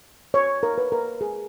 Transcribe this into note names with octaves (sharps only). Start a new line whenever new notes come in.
C#5
A#4
B4
A#4
G#4